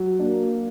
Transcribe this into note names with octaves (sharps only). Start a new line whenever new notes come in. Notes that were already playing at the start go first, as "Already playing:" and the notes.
Already playing: F#3
A#3 D4